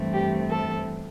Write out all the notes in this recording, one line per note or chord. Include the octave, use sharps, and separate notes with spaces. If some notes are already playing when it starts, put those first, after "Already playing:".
Already playing: G2 E3 A3 C4
G4
A4